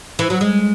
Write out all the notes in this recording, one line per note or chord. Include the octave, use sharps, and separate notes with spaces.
E3
F#3
G#3